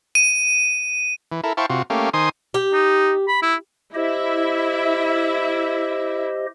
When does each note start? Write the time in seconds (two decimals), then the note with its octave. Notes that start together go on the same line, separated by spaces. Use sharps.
0.15 D#7
1.32 E3
1.44 E4 A4 A#4
1.57 E4 C5 F5 G5 A5 C#6
1.70 C3 F4 F#4
1.90 A3 A#3 C#4 G4 F5
2.14 D#3 C5 G#5 C6 D#6
2.54 G4
2.73 D#4
3.28 B5
3.43 E4
3.95 E4 G4 C5 D#5 E5